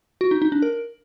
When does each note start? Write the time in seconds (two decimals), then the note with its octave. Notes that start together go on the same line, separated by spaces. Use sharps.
0.21 F#4
0.31 D#4
0.42 D#4
0.52 D4
0.62 A#4